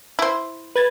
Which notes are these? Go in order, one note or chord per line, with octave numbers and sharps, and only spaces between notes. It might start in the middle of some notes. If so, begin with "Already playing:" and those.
E4 C5
B4 G#6 A6